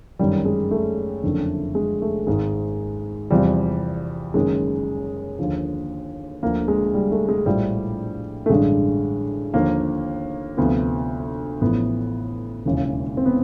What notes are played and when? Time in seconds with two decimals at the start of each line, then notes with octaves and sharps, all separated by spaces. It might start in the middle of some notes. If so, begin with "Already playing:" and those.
0.19 G1 F#2 D#3 G3
0.45 G#3
0.71 A3
1.23 F#1 F2 D3
1.75 G#3
2.02 A3
2.27 G#1 G#2 D#3 G#3
3.30 E2 C3 F3 G3
4.34 F#1 F#2 D#3 G#3
5.39 D#2 D3 F3
6.43 D2 D3 F3 A#3
6.68 G#3
6.94 G3
7.12 A3
7.29 G#3
7.46 A#1 A2 F3 G3
8.46 A3
8.49 A1 G2 D3 G#3
9.54 D#2 D3 F3 A#3
10.57 D2 C3 F3 B3
11.61 A1 A2 F3 B3
12.65 E1 D#2 C#3 E3
13.17 C4
13.26 B3